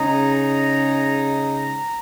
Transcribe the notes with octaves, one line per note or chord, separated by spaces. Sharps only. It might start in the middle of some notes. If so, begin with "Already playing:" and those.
Already playing: C#3 G#3 D#4 A#5
A#5